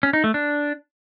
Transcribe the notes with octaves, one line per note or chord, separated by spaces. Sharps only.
C#4
D#4
A3
D4